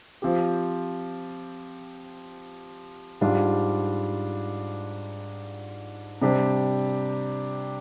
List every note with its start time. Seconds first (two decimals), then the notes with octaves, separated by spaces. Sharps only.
0.22 F3 C4 G4
3.21 G#2 G3 D4 F4
6.22 C3 G3 D4 G4 C5